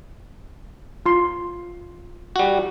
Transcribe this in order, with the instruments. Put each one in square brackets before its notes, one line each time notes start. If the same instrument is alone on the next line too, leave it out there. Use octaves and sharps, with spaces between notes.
[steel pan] F4 C6
[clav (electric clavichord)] G3 F#4